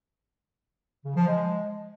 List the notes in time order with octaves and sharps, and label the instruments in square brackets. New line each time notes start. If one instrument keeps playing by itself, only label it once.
[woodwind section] C#3
F3
G#3